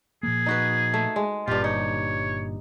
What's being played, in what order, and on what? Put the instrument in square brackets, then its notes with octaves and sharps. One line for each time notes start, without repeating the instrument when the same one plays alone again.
[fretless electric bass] A#2 F3 A#3 [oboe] G#4
[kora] D#4 F#4 B4
A3
G#3
[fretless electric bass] G1 A#2 [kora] G2 G4 [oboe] F4
[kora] D#4 [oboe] C#5